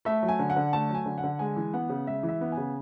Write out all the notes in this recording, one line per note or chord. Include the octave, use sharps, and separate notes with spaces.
A3 E5
F#3
G#5
D3
F#5
D3
A3 A5
F#3 G#5
D3
F#5
D3
G#3 G#5
E3
B3 F#5
C#3
G#3 E5
E3
E5
B3
G#5
C#3